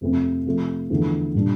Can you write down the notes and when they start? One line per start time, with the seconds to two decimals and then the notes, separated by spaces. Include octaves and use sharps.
0.01 F2 C3 F3 A3 C4
0.46 C3 F3 A3
0.90 E2 D3 F3 A3
1.35 A#2 G3 D4